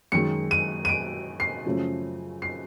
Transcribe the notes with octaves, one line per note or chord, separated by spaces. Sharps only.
F#2 D#3 G#3 C#7
D#7
D#7
D7
C7
F#2 C#3 F3 A3 C#4
C7